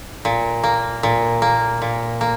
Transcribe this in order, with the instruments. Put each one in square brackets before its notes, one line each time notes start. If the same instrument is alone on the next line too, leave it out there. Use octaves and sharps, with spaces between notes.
[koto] A#2
A#3
A#2
A#3
A#2
A#3